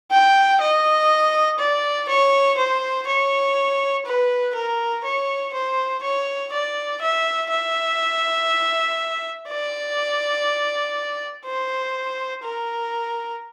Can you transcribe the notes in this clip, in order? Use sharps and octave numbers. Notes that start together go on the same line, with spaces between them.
G5
D#5
D5
C#5
C5
C#5
B4
A#4
C#5
C5
C#5
D5
E5
E5
D5
C5
A#4